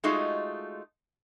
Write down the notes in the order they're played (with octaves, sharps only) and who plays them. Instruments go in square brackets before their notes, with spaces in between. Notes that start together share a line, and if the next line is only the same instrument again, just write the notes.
[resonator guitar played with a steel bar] G#3 A3 D#4 F4 F#4 G#4